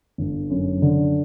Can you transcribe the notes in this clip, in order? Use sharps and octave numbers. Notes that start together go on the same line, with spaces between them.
G1
F#2
D3